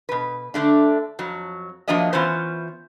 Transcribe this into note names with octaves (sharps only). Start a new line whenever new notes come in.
B2 B4
D3 A3 D4
F2 F#3
F3 F#3 A#3 D4 D#5 E5
E3 B3 C#4 F4 C5